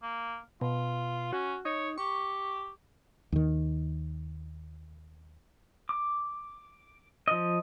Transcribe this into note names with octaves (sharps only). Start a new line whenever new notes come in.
A#3
B2 F4
C#4 F#4
D#4 C#5
G4 C#6
D#2 D#3
D6
F3 D#5